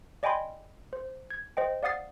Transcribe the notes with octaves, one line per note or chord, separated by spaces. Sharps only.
D5 D#5 G5 G#5 B5 C6
C5
G#6
C5 D#5 G5
D5 F5 F#5 D#6 A6 C7